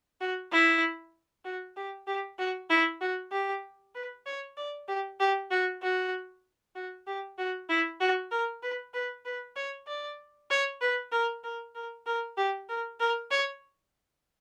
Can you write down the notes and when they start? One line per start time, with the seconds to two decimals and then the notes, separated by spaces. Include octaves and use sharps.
0.21 F#4
0.52 E4
1.45 F#4
1.77 G4
2.07 G4
2.39 F#4
2.70 E4
3.01 F#4
3.32 G4
3.95 B4
4.26 C#5
4.57 D5
4.88 G4
5.20 G4
5.51 F#4
5.82 F#4
6.75 F#4
7.07 G4
7.38 F#4
7.69 E4
8.01 F#4
8.31 A#4
8.63 B4
8.94 B4
9.25 B4
9.56 C#5
9.87 D5
10.51 C#5
10.81 B4
11.12 A#4
11.44 A#4
11.75 A#4
12.06 A#4
12.37 G4
12.69 A#4
13.00 A#4
13.31 C#5